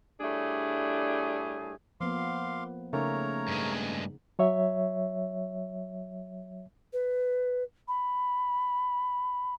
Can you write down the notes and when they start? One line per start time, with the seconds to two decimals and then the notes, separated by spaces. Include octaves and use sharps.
0.21 A2 G3 A3 D4 G#4
2.01 F3 A#3 B3 F5 C6 D6
2.93 C#3 A3 A#3 C#4 D#4 A#4 C#5 A#5
3.48 G2 G#3
4.39 F#3 C#5 E5
6.93 B4
7.88 B5